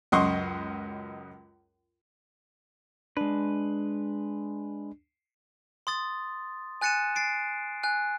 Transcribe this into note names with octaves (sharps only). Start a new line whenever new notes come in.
C#2 F#2 D#5 F#5 C6 C#6
G#3 D4 B4
C6 D#6 A6
G#5 F#6 A6 C#7 D#7 E7
A6 C7 D7
G#5 F#6